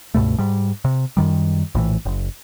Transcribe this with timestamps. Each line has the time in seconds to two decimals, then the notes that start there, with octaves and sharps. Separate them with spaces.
0.14 C#2 G2 B2 A3
0.38 G#2 G3
0.85 C3
1.17 F#2 D#3 G3
1.75 A#1 A2 E3
2.05 F#1